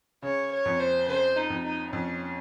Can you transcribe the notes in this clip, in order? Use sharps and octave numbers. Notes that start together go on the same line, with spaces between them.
C#3 C#5
C#5
F2
C5
C#3 C5
D#4
F2
D#4
F2 C#4